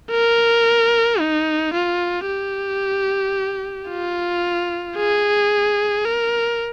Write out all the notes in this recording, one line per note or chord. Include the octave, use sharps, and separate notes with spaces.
A#4
D#4
F4
G4
F4
G#4
A#4